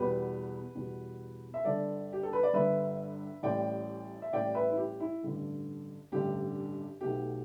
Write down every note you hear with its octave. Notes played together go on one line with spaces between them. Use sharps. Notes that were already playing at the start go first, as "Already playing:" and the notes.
Already playing: E2 B2 G3 G4 B4
E2 B2 G3
E5
G1 G2 D3 A4 D5
G4
A4
B4
D5
G1 G2 D3 B4 E5
A1 A2 G3 D5 G5
E5
A1 A2 G3 D5 G5
B4 E5
E4
G4
E4
A1 G2 D3
A1 G2 D3 G4
B1 B2 A3 G4